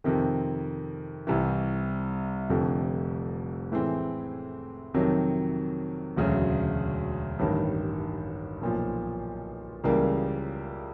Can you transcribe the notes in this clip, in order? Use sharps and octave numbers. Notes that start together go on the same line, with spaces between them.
F2 C3 D#3
C2 C3 E3
F1 F2 D3
A2 E3 G#3 C4
F2 C3 D#3 F#3
E1 D2 C#3 F#3
A1 G2 D#3
B1 A#2 F3
C#2 C#3 E3 G3 A#3